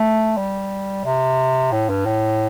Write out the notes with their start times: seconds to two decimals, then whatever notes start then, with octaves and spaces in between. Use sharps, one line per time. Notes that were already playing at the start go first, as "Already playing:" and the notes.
Already playing: A3
0.37 G3
1.05 C3
1.72 A2
1.89 G2
2.06 A2